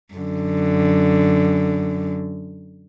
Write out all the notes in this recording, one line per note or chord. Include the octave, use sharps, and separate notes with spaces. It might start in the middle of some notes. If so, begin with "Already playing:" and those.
F#2 D3